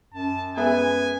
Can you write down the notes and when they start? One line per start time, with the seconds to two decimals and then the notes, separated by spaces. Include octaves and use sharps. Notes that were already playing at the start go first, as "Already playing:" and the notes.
0.13 F#2 A5
0.57 G#3 B3 E5 G#5